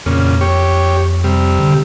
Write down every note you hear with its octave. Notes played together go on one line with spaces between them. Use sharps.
F2 A#2 C#3
G4 C#5
C3 G3
D3